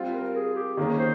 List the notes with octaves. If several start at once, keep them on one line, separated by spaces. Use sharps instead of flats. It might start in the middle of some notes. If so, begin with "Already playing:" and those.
Already playing: G3 C4 F4
A#4
G#4
G4
D#3 A#3 C#4 G#4
C5